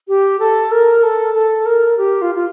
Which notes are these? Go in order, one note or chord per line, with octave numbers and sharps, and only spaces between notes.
G4
A4
A#4
A4
A4
A#4
G4
F4
F4